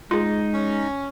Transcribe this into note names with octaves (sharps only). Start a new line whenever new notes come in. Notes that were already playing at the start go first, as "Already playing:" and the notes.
G#3 D#4 F4 G#4
C#4